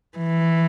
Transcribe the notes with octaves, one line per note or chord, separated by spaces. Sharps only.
E3